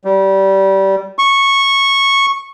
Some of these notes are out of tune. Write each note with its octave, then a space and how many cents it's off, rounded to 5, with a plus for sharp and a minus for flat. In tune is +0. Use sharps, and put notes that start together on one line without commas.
G3 -20
C#6 -10